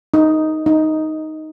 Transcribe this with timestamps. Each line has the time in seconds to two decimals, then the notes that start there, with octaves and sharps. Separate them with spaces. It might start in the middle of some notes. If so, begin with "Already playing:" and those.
0.14 D#4
0.66 D#4